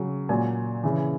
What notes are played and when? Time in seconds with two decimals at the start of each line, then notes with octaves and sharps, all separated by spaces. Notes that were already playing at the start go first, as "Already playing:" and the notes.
Already playing: C#3 F#3
0.29 A#2 F#3 G#5
0.83 C#3 E3